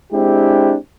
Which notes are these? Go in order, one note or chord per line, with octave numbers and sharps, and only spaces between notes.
G#3 C4 D4 E4 G4